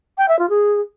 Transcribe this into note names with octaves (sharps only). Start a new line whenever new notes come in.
G5
E5
F4
G#4